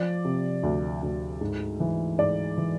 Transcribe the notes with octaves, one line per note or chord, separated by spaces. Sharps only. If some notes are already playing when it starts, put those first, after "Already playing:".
Already playing: F3 D5
C3
D2
D2
G#2
E3
G#2 D5
E3